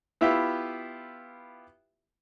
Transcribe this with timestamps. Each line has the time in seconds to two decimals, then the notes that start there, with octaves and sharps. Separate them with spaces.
0.21 B3 E4 F4 G4 E5